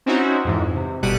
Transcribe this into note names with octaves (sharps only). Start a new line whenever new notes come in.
C4 C#4 D#4 E4 F#4
F2 G#2 E3
C3
G1 B2 G3 F#6 C#7 D#7